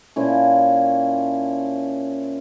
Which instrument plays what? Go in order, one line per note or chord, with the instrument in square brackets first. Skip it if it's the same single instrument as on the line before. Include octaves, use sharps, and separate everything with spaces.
[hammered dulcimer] A#2 F3 C#4 E4